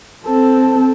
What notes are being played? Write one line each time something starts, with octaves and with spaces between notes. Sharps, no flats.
C4 A4